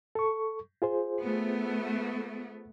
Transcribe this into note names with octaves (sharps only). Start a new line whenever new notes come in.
A4 C#6
F4 G#4 C5
A3 B3